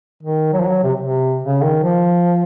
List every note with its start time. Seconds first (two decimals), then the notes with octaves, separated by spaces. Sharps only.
0.23 D#3
0.53 F#3
0.60 F3
0.67 F#3
0.83 C3
1.00 C3
1.43 C#3
1.62 D#3
1.83 F3